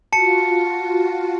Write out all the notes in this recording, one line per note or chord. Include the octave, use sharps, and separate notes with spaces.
F4 F#4 A5 C#7